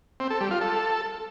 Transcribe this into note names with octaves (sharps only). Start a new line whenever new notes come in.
C4
A4
G3
F4
A4